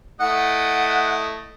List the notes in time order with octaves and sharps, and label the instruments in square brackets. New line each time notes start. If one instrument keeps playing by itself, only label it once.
[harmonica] A3 E4 D#5 [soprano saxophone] F#5